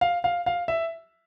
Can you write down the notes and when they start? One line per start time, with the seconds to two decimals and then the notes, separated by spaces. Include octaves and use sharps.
0.01 F5
0.24 F5
0.46 F5
0.68 E5